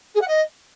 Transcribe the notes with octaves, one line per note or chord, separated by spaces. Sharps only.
G#4
F#5
D#5